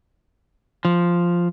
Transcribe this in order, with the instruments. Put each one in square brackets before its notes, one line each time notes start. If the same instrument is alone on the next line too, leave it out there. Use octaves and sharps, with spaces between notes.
[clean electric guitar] F3